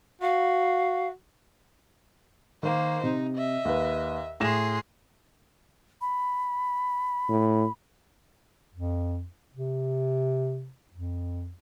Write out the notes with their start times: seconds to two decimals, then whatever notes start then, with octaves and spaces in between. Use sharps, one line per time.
0.22 F#4 F5
2.63 D#3 A#3 C5
3.03 C3 D#4
3.35 D#5 E5
3.65 D#2 B4
4.40 A2 G#4 C6 A#6 E7
6.01 B5
7.29 A2
8.75 F2
9.55 C3
10.93 F2